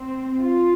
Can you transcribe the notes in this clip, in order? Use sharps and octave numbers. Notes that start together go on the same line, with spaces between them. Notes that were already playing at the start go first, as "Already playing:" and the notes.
Already playing: C4
F4